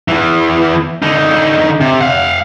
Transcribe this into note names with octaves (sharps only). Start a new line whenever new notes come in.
E2 E3
D3 D#4
C3
F5 F#5